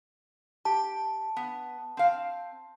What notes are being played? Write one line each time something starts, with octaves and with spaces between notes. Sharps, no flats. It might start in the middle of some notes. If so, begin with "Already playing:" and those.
G4 A5
B3
C4 F5